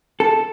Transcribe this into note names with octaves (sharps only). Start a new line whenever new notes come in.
A4